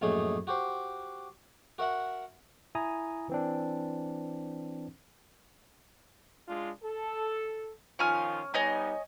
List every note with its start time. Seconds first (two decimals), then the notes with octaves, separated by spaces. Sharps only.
0.01 A#1 F#2 A2 A3 D#4 G#4
0.47 F#4 G4 C5
1.78 F#4 A#4 E5 F#5
2.75 E4 G#5 A#5 D#6
3.29 E3 C4 D4
6.48 G#3 D4 F4
6.83 A4
7.99 D#3 F3 C#4 F4 G#5 F6
8.54 G3 B3 D#4 C#5 D#5 G#5